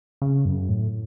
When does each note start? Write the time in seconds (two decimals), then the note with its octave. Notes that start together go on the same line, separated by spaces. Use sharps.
0.22 C#3
0.45 F#2
0.69 A2